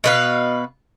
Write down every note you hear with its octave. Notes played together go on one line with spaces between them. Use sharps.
B2 B4 F5